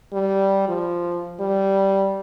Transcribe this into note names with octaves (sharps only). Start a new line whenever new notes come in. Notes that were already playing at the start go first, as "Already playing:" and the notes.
G3
F3
G3